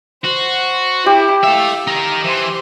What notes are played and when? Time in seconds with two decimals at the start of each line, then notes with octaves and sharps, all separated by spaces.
0.24 F#4 C5
1.06 E4 G4
1.43 A4 E5 F5
1.87 D#4 A#4
2.23 E3 C5 C6